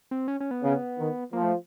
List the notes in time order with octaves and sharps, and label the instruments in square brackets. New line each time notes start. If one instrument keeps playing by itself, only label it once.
[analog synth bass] C4
C#4
C#4
B3
[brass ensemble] C#3
D#3
[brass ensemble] F3 [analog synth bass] A#3
[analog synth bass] A3